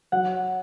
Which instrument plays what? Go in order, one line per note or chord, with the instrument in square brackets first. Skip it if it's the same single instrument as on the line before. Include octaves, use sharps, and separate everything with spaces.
[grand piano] F#3 [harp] F#5